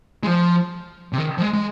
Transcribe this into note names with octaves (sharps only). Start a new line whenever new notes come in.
G#3
F3
C3
D#3
F3
G#3
G#3